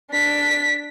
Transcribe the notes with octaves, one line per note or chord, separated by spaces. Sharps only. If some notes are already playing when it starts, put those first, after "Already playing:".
D4 B6